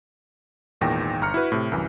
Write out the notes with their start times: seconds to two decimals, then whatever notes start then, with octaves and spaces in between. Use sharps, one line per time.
0.81 G#1 E2 A#2 D#3 G5 A#6
1.21 G1 A#5 F6 C#7
1.34 E4 F#4 B4
1.52 A2 C3
1.72 C2 F#2 E3